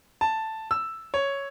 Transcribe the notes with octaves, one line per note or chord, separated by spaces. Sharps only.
A5
E6
C#5